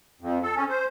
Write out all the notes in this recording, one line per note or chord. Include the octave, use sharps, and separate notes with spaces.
F2
A4
C#4
C5